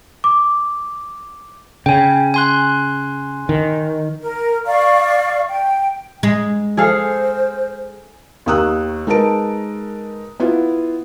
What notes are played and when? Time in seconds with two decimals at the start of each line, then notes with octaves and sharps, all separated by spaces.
0.24 D6
1.86 C#3 G5 G#5
2.34 G#5 C6 F#6
3.49 D#3
4.21 A#4
4.66 D5 F5 C#6
5.49 G5
6.23 G#3
6.77 G#4 A4 C5 F5
8.46 D#2 D#3 D#6 E6 F#6
9.07 G#3 D#4 A#4 B4 A5 D7
10.40 B3 E4 F4